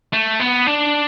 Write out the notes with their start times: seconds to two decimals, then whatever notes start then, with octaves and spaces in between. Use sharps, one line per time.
0.13 A3
0.40 B3
0.67 D4